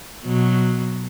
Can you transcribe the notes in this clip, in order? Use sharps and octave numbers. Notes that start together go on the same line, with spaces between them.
B2 F#3